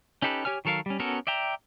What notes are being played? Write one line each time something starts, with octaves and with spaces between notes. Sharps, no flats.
C#4 D#4 G4 A4 B4
G4 C#5 G#5 F6
D#3 F#3 A4 A#4 F5
G3 C#4
B3 C#4 F#4 A4 A#4
D5 E5 G5 A#5